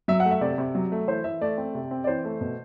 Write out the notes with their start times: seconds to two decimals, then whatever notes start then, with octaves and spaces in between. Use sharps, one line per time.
0.08 F#3 E5
0.20 F#5
0.25 A3
0.31 E5
0.41 C3 D5
0.58 C3
0.75 F#3
0.92 A3
1.08 E3 C5
1.24 E3 E5
1.41 A3 D5
1.57 C4
1.75 C3
1.91 C4
2.04 D5
2.07 E3 C5
2.25 A3
2.41 B2